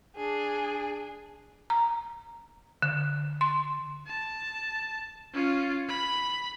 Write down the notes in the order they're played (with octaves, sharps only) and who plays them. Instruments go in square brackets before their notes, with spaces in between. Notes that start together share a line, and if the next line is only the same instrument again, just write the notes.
[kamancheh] D4 G#4
[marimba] A#5
D3
C6
[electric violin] A5
C#4 F4
B5